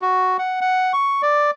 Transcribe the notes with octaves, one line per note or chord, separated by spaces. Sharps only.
F#4
F#5
F#5
C#6
D5